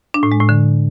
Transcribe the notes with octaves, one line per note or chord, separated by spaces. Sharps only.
D4
A2
G#3
A2
D3